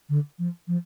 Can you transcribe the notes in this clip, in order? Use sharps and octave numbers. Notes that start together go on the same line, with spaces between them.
D3
F3
F3